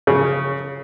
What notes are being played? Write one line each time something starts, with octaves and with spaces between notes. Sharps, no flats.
C#3